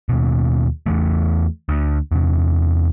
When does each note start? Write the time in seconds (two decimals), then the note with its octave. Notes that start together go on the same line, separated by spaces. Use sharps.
0.09 D#2 B2
0.86 E2 E3 A3
1.69 D2
2.12 E2 C3